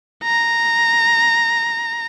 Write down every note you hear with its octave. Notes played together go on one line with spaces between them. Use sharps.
A#5